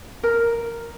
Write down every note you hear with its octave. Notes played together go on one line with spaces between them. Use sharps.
A#4